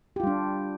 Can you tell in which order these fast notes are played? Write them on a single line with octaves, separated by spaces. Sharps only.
G4 F4 G3 D4